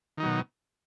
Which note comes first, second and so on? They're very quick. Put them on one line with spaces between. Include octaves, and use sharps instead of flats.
D#3 D#4 F#3 B2